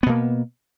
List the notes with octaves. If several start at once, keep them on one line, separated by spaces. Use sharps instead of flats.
B2 A#3 B3